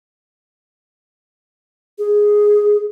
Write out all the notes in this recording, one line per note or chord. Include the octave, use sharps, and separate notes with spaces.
G#4